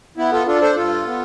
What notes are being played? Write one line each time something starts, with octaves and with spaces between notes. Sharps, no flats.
B3 E4
F4 A4
D4 F4 A4
A4 C5
G2 F4 A4
B3